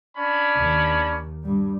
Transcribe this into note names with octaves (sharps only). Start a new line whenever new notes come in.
C#4 D4 B5
D#2 D#3
G2 G3